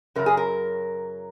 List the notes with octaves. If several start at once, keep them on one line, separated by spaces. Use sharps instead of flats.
F#2 C#3 F#3 A#4
G#4
A#4